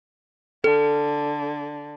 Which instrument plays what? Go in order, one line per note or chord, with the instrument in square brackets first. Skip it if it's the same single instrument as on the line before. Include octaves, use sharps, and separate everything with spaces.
[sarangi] D3 [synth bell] A4